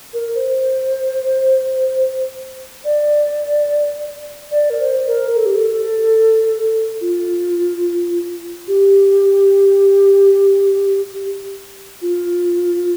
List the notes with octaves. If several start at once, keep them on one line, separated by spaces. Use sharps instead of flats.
A#4
C5
D5
D5
A#4
C5
A#4
A4
G4
A4
F4
G4
F4